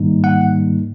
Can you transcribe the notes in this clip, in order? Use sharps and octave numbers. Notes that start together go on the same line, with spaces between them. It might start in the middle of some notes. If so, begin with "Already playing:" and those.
Already playing: G#2 D#3 G3 A#3 D#4
F#5